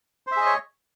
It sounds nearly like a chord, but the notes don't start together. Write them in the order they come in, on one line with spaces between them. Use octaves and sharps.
C5 E5 G#4 D#5 C#5